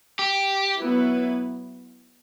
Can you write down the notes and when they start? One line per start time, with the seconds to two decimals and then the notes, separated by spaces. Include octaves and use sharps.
0.19 G4
0.80 F#3 B3 E4 B4